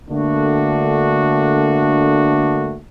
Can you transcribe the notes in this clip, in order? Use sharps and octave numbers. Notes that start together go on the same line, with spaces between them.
D3 A3 A#3 D4 F#4